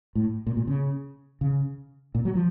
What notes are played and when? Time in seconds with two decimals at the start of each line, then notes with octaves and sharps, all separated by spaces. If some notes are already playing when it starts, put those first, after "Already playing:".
0.15 A2
0.47 A#2
0.57 A#2
0.67 C#3
1.41 C#3
2.15 A#2
2.25 F#3
2.35 F3